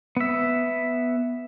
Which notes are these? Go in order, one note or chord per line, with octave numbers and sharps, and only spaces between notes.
B3 E5